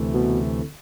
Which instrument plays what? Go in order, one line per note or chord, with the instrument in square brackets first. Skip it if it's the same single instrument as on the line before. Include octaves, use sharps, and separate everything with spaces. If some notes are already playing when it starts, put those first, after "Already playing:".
Already playing: [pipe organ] D2 C3 E3 A3
[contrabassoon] B2